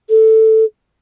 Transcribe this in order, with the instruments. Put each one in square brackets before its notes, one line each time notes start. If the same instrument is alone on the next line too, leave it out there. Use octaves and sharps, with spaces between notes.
[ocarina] A4